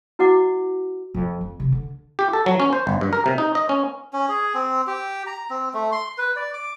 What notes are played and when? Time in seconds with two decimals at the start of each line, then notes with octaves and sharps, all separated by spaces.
0.19 E4 F#4 D#5 F#5 D6
1.14 F2
1.41 C4
1.60 C3
1.72 D3
2.19 G4
2.33 A4
2.46 F#3
2.60 C#4
2.73 C5
2.87 G1
3.01 G2
3.13 A#4
3.26 C3
3.38 D#4
3.55 D#5
3.69 C#4
4.13 C#4
4.29 G#4
4.54 C4
4.87 G4
5.27 A#5
5.50 C4
5.74 A3
5.92 C6
6.18 B4
6.36 D5
6.54 D6